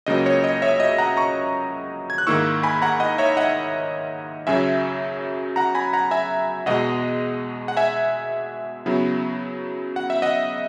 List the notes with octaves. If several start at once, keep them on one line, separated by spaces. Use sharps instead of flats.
C#2 C#3 F#3 A#3 D#5
C#5
D#5
C#5 E5
D#5
F#5 A#5
A#5 C#6
G#6
F#6
G#2 D#3 A#3 E4 C#6 E6
G#5 B5
F#5 A#5
D#5 F#5
C#5 E5
D#5 F#5
F#2 C#3 F#3 E5 G#5
F#5 A#5
G#5 B5
F#5 A#5
E5 G#5
E2 B2 G#3 D#5 F#5
F#5
E5 G#5
C#3 F#3 B3 E4
F#5
E5
D#5 F#5